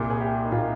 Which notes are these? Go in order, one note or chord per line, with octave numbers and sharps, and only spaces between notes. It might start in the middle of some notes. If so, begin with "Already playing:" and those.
Already playing: C2 A#2
G#4
G4
D#4
A#2 F4